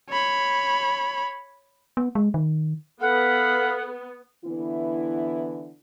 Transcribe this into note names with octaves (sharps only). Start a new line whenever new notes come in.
C#5 B5
B3
G#3
D#3
B3 A4 F5 F#5 B5
D3 E3 B3 E4